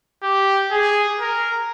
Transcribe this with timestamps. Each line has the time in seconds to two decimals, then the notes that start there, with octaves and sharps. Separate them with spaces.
0.23 G4
0.71 G#4
1.20 A#4